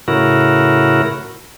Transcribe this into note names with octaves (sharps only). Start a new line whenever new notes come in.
A2 C#3 E4 F#4 A#4